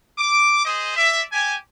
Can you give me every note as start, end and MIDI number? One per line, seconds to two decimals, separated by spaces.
0.18 0.65 86
0.65 0.96 68
0.65 0.96 72
0.65 0.96 75
0.96 1.22 74
0.96 1.22 76
1.32 1.55 67
1.32 1.55 80